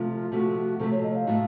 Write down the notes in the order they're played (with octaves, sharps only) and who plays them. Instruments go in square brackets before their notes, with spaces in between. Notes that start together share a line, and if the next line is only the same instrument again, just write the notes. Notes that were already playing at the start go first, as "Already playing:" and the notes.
Already playing: [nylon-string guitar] C3 F3 A3 [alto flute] F4
[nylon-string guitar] C3 F3 A3 [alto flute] F#4
[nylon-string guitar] C3 F3 A3 [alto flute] A4
[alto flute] C#5
D#5
F5
[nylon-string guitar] A2 A3 D#4 F#4